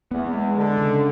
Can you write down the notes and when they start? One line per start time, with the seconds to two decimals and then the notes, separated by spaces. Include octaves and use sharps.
0.11 E2 B3
0.33 G#3
0.55 D3 G#3
0.78 C#3